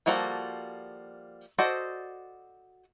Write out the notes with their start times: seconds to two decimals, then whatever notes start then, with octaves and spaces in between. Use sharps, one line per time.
0.06 F3 G3 A#3 F#4 A4
1.58 F#4 A4 C5 D5 D#5